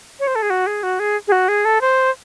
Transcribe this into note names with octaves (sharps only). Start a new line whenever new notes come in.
C#5
C5
A4
G#4
F#4
G#4
F#4
G#4
G#4
F#4
G#4
A4
C5